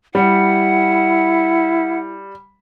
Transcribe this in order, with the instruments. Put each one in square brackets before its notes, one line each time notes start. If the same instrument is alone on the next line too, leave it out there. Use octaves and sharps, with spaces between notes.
[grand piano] G3 [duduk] E4 [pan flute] F#5